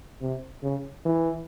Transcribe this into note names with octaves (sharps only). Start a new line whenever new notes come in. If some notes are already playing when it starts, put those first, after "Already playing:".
C3
C#3
E3